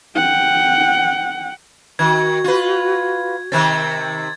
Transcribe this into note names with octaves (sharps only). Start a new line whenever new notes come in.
F#5 G5
D#3 F#4 G#6
F4 B4
C3 D#3 C4 G#6 A6